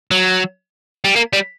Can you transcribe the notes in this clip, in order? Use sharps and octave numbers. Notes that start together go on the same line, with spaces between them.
F#3
G3
A#3
G3